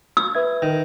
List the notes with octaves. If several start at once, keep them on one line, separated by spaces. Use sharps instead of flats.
E6
B4 E5 G#6
D#3